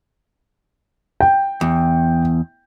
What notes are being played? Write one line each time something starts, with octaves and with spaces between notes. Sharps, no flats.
G5
E2